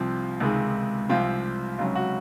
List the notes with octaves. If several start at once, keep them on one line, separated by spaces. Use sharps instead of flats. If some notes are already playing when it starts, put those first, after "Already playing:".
Already playing: C2 C3 F3 C4 F4
C#2 C3 D#3 G#3
C2 C3 F3 C4 F4
C#2 C3 F#3 C#4 F4
F#4